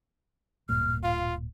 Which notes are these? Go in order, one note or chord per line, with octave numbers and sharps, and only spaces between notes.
D1 G2 A#2 F6
F4 F5